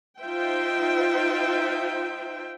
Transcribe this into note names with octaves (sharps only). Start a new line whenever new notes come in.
D#4 F4 C5 E5 G5